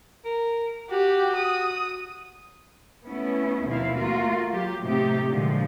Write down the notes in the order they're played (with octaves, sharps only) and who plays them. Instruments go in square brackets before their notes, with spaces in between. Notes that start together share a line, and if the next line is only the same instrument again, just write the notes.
[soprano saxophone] A#4
[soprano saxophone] F#4 [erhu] G4
[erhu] D#6
[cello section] A3 B3 C#4 E4
D#2 B2 F3 C4 E4 F5
A3 A#3 F4 F#4 A#4
F#3 G4
A2 C3 A3 C4 D#4 G4
A#2 D3 F3 F#3 G#3